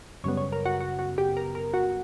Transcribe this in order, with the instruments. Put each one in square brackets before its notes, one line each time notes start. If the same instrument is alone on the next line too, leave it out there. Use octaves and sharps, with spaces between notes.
[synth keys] F#2 C#3 G3 B3 C#5
C#5
A#4
F#4
F#4
F#4
G4
A#4
A#4
F#4